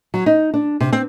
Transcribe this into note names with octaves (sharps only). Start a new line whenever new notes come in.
F#3
D#4
D4
C3
C4